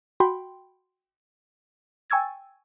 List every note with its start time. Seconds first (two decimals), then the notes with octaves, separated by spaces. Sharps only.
0.20 F#4 G5 B5 C6
2.10 G5 G#5 C#6 E6 G#6 A6